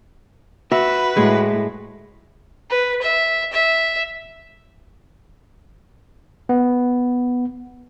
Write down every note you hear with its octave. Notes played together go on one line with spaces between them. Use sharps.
F#4 B4 E5
A2 G#3
B4
E5
E5
B3